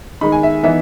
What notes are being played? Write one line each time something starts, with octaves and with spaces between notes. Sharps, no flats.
D#3 G#3 D#4 B5
G#5
E5
E3 B3 D#4 E5